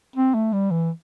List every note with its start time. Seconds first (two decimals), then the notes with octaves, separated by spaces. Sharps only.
0.16 C4
0.34 A3
0.53 G3
0.70 E3